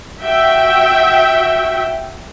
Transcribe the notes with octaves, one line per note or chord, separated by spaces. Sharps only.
F#4 E5 G5